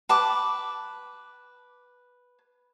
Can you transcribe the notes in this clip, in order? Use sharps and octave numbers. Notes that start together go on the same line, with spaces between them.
B4 A5 D6